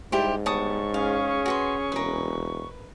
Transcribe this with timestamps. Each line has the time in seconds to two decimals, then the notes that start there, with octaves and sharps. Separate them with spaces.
0.12 G#2 G3 E4 G4 C5
0.46 D2 G3 B3 C#5 A5 C#6 D#6
0.94 C#4 G#4 F5
1.46 F#4 B4 C6
1.92 E1 A#4 B4